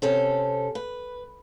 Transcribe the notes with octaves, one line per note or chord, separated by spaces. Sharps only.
C3 C#4 A4 C5
B4